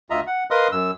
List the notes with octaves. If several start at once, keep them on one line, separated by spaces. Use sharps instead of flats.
D2 F4 D#5 E5 A#5
F#5
A#4 B4 D#5 F5 C6 D#6
F#2 E6